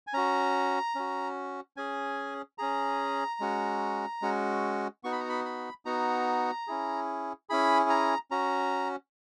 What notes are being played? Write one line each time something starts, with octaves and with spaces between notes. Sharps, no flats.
G#5
C#4 F#4 A#5
C#4 F#4
C#4 G#4 G#5
C#4 G#4 A#5
G#3 C#4 F#4
G#3 C#4 F#4
B3 D#4 F#4 C#6
B5
A#5
B5
B5
B3 D#4 F#4 A#5
C#4 E4 G#4
C#4 E4 G#4 B5
A#5
C#4 F#4 A#5